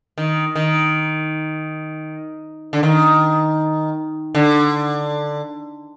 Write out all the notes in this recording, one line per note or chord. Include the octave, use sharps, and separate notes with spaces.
D#3
D#3
D3
D#3
D3